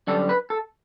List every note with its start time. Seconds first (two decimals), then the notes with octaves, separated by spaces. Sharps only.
0.07 F#2 D3 G3 A4
0.29 B4
0.50 A4